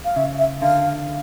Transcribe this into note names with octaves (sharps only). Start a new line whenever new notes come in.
F5
C#3 E5
E5
D3 F5